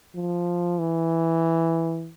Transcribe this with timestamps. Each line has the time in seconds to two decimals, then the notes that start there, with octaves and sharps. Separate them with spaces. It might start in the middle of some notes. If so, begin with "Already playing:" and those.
0.15 F3
0.80 E3